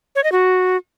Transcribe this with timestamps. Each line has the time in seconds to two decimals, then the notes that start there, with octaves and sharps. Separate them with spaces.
0.16 C#5
0.24 D#5
0.32 F#4